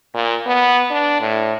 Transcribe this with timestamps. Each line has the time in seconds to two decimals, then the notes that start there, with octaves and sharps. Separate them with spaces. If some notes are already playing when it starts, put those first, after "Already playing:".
0.14 A#2
0.46 B3
0.91 D4
1.21 A2